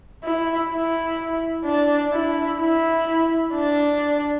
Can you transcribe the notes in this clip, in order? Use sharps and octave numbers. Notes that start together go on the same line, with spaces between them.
E4
E4
D4
E4
E4
D4